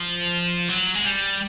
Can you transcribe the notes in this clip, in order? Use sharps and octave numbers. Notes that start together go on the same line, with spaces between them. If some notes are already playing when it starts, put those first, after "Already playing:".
Already playing: F3
F#3
G#3
G3